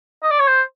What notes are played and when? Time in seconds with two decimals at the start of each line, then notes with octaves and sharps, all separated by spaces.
0.23 D#5
0.31 D5
0.40 C#5
0.48 C5